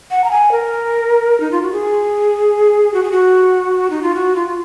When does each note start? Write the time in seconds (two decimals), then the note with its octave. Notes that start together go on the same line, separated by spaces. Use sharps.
0.11 F#5
0.24 A#5
0.31 G#5
0.51 A#4
1.40 D#4
1.51 F4
1.62 F#4
1.72 G#4
2.94 F#4
3.03 G#4
3.12 F#4
3.90 D#4
4.02 F4
4.15 F#4
4.36 F4